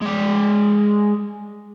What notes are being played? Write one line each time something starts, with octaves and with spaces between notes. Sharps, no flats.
G#3 D5